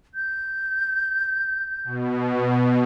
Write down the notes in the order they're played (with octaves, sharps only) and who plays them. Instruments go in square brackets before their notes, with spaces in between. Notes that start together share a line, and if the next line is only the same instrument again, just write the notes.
[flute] G6
[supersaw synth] B2